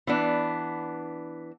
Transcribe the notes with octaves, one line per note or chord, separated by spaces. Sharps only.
E3 B3 D4